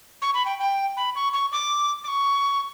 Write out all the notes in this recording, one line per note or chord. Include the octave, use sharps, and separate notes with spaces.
C#6
B5
G5
G5
B5
C#6
C#6
D6
D6
C#6